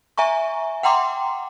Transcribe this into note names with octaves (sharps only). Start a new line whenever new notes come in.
E5 G#5 A#5 C#6
F#5 G5 A#5 C6 D6